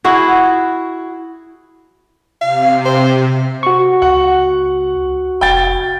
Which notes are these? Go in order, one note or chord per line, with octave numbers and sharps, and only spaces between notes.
E4 F#4 G#4
C3 F5
C5
F#4 C#6
C#2 F#5
F1 G5 A6